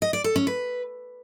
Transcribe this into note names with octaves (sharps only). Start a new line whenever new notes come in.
D#5
D5
A4
C#4
B4